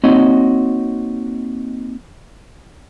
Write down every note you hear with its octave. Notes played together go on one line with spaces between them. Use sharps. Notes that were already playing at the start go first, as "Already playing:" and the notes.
A#3 C4 D#4 F#4 C#5 D#5